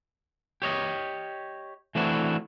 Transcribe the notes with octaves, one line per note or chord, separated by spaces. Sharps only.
G4 C#5 D#5
E3 A3 C4 D4 E4 F#4